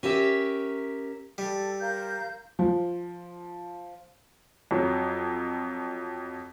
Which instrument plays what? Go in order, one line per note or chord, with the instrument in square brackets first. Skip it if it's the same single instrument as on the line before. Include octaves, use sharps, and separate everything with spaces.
[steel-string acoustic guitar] C#4 G4 A#4 E5
[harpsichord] G3 [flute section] A4
[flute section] A#4 F5 G6
[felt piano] F3
[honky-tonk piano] F2 F#3